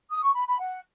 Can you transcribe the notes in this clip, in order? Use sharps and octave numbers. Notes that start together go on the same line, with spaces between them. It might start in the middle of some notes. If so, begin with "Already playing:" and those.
D#6
C#6
B5
B5
F#5